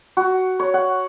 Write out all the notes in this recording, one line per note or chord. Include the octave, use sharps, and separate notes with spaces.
F#4
C#5
F#5